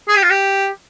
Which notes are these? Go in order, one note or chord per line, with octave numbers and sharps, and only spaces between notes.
G#4
G4
F4
G4